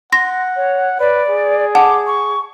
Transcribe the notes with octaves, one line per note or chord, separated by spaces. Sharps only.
F#5 C6 A#6
C#5
B4 D5
G#4
F#5 A5 D6
C#6